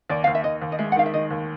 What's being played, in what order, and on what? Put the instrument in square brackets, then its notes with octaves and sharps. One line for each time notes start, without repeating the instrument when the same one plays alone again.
[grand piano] D#2 [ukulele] D5
[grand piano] D#2 [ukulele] F5
[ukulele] E5
[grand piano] D#2 [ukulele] D#5
[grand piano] D#2
[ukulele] D#5
[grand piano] G#3 [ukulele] E5
[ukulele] F#5
[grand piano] D#3 [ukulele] F5
[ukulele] E5
[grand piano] D#3 [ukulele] D#5
[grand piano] D#2